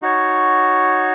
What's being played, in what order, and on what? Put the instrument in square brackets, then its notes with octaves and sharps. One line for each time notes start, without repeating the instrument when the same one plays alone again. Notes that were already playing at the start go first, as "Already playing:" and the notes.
[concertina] D#4 F#4 C#5